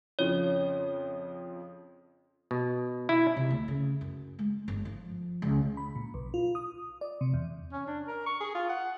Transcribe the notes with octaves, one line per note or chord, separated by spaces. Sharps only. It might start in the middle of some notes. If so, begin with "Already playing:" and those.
F2 C#3 F3 C#5
B2
E4
C3
D2
C#3
F#2
G#3
G1
F3
C#2
B5
A#2
B1
F4
D#6
D5
C3
E2
C#4
D4
A#4
C#6
G#4
F4
F#5